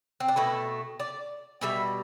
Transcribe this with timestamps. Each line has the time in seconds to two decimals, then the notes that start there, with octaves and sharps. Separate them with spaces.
0.20 C4
0.28 D4
0.36 B2 A3 E4
1.00 D5
1.61 B2 G3 E5